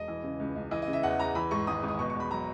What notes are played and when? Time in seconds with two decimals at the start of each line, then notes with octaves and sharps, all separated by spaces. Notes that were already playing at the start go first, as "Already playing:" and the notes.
Already playing: E1 D#5
0.08 E3
0.24 C#3
0.40 C#2
0.56 C#2
0.71 E3 D#5
0.82 D#5
0.87 C#3
0.93 E5
1.03 E2 F#5
1.20 E2 A#5
1.35 E3 B5
1.51 G#2 C#6
1.67 G#1 D#6
1.83 G#1
1.88 D#6
1.99 B2 C#6
2.10 C#6
2.15 E2
2.20 B5
2.31 F#3 A#5